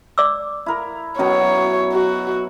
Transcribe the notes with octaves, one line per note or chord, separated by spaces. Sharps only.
D5 D6 E6
E4 A#4
B2 F#3 C#4 A#4 C#5
F#4